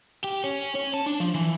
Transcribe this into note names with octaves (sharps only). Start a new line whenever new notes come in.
G4
C#4
C#4
A5
D4
F3
E3